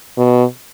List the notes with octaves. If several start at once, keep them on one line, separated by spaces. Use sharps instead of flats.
B2